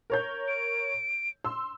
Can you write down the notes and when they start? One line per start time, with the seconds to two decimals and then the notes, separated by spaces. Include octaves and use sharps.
0.10 A#4 C#5 G6
0.48 D7
1.44 C6 E6